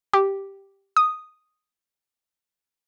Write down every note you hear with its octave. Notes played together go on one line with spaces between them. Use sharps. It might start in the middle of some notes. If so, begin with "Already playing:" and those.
G4
D#6